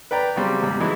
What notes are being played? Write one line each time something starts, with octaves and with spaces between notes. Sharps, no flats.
B4 D5 G5 A#5
C#3 F#3 G3 C4
E2 G#2 G3
E3 F#3 G#3 D#4 E4